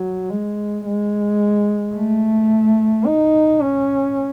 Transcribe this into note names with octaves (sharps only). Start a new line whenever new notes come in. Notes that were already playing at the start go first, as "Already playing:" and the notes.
Already playing: F#3
G#3
G#3
A3
D#4
C#4